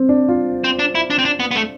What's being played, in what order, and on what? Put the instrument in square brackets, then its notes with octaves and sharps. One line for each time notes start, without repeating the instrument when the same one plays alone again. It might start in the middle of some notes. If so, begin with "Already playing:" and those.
Already playing: [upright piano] C4
D4
F4
[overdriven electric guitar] C4
D4
E4
D4
C4
D4
B3
B3
A3